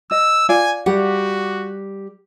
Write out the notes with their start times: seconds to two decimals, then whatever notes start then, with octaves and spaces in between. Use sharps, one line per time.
0.11 D#5 E6
0.49 F4 D5 F5 G#5
0.86 G3 F#4 G4 F#5